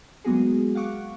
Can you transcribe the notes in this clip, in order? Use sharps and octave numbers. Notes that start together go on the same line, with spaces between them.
F#3 G#3 A#3 B3 F#4 G#4
F5 F#5 C#6 D6